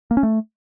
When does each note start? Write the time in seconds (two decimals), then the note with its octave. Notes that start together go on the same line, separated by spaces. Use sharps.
0.11 A#3
0.17 C#4
0.23 A3